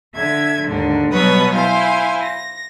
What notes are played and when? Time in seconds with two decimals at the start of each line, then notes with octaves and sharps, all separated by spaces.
0.15 D3 E5 G#6
0.67 D#2 G#2 D3
1.12 B2 F#3 G3 B4 C#5 D#6
1.53 E4 C5 F5 G#5
2.23 A#6